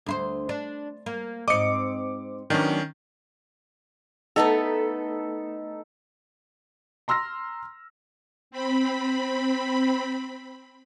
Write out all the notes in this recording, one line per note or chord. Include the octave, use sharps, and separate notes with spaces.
D2 E4 C5
D4
A#3
G#2 C4 D#5 D6 C#7
D#3 F#3 B3 C#4 D4
A3 B3 D#4 A4 A#5
A#5 C6 E6 F6 A#6
C4 B5